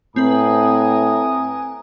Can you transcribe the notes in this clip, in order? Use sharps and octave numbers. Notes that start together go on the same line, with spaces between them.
A2 C4 B4 G#5 A#5 D#6